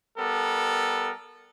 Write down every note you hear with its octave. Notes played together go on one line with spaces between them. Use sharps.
G3 B3 A4 A#4